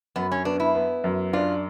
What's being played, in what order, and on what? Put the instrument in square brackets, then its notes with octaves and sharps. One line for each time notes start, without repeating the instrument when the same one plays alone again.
[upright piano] F#2 [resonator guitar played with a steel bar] B3
[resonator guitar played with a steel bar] C#4
[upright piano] B3 [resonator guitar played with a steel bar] D4
[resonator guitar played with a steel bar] E4
[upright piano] B3
F#2
[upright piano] D4 [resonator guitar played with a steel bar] F4